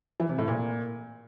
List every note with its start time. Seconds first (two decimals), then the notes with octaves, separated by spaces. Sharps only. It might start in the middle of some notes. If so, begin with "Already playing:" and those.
0.20 E3
0.29 C3
0.38 A2
0.48 A#2